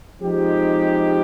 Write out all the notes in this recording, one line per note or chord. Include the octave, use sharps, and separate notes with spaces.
F3 G#3 C4 D#4 G4